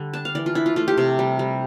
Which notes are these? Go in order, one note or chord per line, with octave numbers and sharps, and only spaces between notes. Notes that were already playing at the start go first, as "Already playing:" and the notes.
Already playing: D3 G3
D4 A5
F5
E3 D5
F4
D4 E4
F4
A3 F4
G4
C3
G3
G3